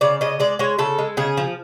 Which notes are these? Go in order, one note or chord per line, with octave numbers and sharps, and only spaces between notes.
C#3 D5
C#3 D#5
G#3 D5
G#3 C#5
C#3 A4
G#3
C#3 G#4
F3